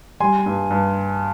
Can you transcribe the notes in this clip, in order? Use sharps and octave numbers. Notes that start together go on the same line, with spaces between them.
G3 G#5 C6
G2
G2